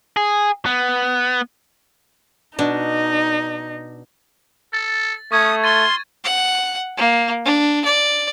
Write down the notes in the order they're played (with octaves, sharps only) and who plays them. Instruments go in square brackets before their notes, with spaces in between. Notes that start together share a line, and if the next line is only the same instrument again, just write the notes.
[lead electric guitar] G#4
B3
[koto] B2 D4 [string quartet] D#4
[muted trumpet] A4 [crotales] A6
[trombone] A3 [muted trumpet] C#4 [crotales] C#6 G#6 [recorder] D#6
[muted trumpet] F4 [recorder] C6 [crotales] A6 D#7
[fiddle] F#5
A#3
D4
D5